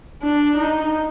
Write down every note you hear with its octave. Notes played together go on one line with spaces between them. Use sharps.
D4
D#4